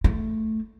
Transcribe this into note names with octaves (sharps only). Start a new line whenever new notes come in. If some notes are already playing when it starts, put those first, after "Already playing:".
A3